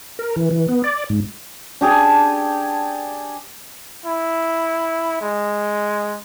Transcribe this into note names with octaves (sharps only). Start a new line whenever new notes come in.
A#4
E3
E3
B3
D5
G#2
D4 G4 G#4 A5
E4
G#3